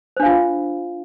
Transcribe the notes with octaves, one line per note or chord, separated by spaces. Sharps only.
D4 F4 C5 F5